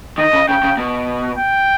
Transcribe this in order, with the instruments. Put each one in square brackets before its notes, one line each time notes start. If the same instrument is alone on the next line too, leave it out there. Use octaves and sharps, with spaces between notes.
[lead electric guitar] D#3 [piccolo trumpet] D#5
[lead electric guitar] C#3
[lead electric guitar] C#3 [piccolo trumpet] G5
[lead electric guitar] C#3
B2
[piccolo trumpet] G5